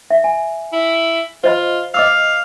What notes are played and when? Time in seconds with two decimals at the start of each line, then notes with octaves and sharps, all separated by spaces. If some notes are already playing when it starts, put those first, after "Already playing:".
0.10 E5
0.24 G#5
0.73 E4
1.44 F4 C5 D#5 B5
1.94 D#5 F5 D6 E6